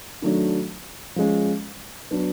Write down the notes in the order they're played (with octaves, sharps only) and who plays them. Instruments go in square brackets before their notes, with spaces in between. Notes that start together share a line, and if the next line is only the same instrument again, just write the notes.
[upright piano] D#3 F#3 A3 D4
F3 G#3 C#4
F#3 B3 D4